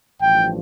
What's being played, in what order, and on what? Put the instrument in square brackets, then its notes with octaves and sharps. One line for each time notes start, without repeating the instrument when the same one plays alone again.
[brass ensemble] A1 G2 F3 G5